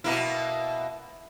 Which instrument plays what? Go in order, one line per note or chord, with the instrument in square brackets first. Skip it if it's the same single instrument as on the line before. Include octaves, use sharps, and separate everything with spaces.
[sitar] B2 A#3 E4